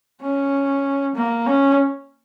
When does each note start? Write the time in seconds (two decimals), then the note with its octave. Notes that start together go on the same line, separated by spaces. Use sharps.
0.22 C#4
1.16 A#3
1.47 C#4